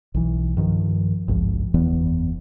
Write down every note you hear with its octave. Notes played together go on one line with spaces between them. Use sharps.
B1 E3
G2 D#3 F3
G#1 C#2 G2 F3
F#1 E2 E3 B3